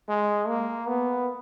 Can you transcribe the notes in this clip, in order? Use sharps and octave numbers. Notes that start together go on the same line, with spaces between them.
G#3
A#3
B3